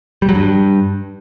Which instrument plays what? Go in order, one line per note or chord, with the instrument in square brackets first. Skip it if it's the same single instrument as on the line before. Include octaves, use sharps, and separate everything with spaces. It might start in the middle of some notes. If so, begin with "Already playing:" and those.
[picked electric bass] G3
F#3
G2